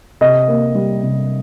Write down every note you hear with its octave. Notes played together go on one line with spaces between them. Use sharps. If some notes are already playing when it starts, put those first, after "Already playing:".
C3 D#5
A#3
G3
C3